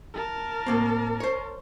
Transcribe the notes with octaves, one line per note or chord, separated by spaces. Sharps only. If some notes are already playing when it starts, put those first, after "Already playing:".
A#4 A5
A2 A#3 C4
C5 C#5